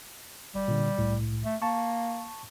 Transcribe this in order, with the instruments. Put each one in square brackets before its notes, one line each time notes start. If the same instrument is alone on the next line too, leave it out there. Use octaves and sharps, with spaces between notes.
[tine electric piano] G1 [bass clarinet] G3
[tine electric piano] A#2 D3
C2 A2
[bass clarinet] A3
[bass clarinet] A#3 [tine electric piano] A5 C#6